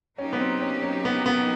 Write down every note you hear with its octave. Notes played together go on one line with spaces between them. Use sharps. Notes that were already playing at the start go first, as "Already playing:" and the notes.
F#3 A#3 C#4 D#4 G4
B3
C4
C#4
C#4
B3
B3